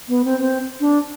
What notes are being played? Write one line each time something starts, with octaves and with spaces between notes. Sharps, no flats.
B3
C4
C4
D4